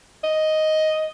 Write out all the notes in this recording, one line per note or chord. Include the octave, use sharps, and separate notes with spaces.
D#5